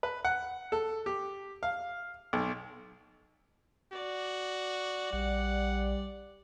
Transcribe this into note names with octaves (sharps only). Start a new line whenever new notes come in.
B4
F#5
A4
G4
F5
B1
F#4 D5
A#1 G3 F#5